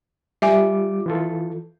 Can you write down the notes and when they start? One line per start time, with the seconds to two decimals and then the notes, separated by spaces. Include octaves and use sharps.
0.42 G3 F4 E5 G#5 D6
1.06 E3 F4 A4